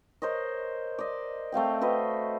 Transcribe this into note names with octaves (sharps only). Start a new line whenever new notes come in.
A#4 C5 C#5 D#5
D5 D#5
A3 C4 F5 G5
F#4 B4 C5 D#5